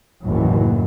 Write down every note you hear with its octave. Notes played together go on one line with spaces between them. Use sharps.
F#1 D#2 A2 E3 F#3